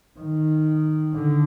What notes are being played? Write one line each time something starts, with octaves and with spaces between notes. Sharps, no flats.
D#3
D3